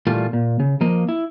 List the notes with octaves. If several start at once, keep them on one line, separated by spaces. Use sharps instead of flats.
A#2 E3 G3 A3 F4
A#2
C#3
F3 A#3 D#5
E4